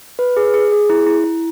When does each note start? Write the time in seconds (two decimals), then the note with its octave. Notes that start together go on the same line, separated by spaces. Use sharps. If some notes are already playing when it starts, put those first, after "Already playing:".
0.19 B4
0.37 G#4
0.54 G#4
0.72 G#4
0.90 E4
1.07 E4
1.24 E4